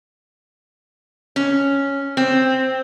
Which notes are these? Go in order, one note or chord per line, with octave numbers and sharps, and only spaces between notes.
C#4
C4